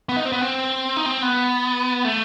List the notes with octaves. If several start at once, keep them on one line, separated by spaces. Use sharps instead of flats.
B3
D#4
C4
B3
C4
D#4
C4
B3
A3